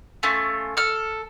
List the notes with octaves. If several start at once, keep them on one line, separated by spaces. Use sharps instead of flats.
A3 C#4 F4
A4 F6